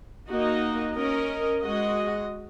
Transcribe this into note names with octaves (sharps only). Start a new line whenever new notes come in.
A#3 D#4 F#4 D#5
C#4 A#4 D#5
G#3 F#4 D#5